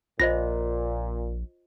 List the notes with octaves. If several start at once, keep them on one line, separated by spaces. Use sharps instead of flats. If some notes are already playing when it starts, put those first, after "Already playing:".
A#1 A#2 F4 C5 D#5 A#6